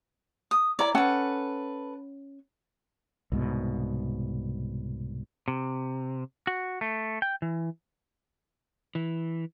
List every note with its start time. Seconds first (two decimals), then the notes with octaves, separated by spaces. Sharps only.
0.51 D#6
0.79 E4 C#5 D5 A#5
0.95 C#4 A4 B4 F#5 G#5
3.32 C2 G#2 B2
5.48 C3
6.47 F#4
6.81 A3
7.22 G5
7.42 E3
8.95 E3